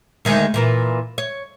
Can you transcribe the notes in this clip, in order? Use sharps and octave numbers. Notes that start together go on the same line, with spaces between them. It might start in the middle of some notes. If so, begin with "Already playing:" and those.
D2 D#3 G#3
A#2 E3 A#4
C#5